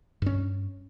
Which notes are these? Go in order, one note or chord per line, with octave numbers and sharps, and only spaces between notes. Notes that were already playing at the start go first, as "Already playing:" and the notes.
G2 C#4